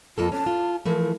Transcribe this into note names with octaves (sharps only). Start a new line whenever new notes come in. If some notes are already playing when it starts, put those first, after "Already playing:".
F2 A#3 F4 A4
C#4 A5
F4
E3 F3 A3 A#4